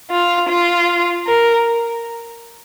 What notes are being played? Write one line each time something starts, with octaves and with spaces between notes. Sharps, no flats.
F4
F4
A#4